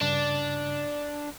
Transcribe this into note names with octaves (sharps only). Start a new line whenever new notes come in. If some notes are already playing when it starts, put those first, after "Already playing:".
G2 C#3 D4